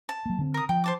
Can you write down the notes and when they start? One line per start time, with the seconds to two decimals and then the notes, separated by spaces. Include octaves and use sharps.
0.09 A5
0.26 F#3 A#3
0.38 D3 C4
0.54 A#4 D#6
0.69 F3 G5
0.84 C5 A5 D6